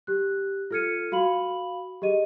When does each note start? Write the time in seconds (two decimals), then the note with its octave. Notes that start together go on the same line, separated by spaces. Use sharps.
0.07 G4 F#6
0.71 F4 A4 F6 G#6 C#7 D#7
1.12 F#4 F5 B5 F#7
2.02 G4 G#4 D#5 D#7